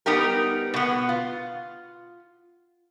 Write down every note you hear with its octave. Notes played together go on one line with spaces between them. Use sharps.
G3 B3 D#4 G4 A#4
B2 B3
F4